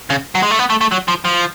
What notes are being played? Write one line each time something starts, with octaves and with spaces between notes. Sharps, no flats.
C#3
F#3
G#3
A3
B3
A3
A3
F#3
F3
F3